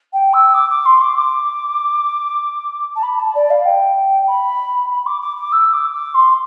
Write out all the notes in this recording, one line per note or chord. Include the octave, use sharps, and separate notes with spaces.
G5
E6
D6
D6
C6
D6
D6
A5
B5
A5
D5
F5
G5
B5
B5
D6
D6
D6
E6
D6
D6
C6